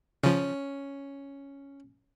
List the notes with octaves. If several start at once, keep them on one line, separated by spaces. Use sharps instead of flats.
C#3 F3 C#4